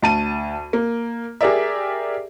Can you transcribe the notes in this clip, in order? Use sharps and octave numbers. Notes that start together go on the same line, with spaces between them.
D2 A5 D#7
A#3
G4 G#4 A#4 D5 E5